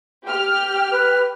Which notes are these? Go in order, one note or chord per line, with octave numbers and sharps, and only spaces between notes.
G4 F6
B4